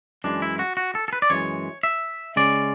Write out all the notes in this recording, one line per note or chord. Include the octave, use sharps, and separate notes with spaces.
F#2 E3 G#3 D4
E4
F#4
F#4
A4
A4
B4
D5
F#2 E3 G#3 C#5
E5
C#3 G#3 C#4 D5